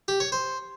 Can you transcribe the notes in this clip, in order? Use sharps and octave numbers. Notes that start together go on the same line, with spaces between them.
G4
C#5
C5